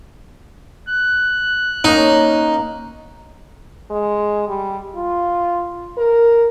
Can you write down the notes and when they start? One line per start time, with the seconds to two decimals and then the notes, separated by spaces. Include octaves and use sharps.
0.89 F#6
1.84 A#3 C#4 D#4 A#5
3.90 G#3
4.48 G3
4.95 F4
5.98 A#4